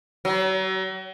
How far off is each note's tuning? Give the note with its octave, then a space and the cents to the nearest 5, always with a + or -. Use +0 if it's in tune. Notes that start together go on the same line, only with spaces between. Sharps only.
F#3 +40